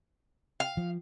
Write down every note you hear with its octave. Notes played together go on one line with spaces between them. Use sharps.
F5
F3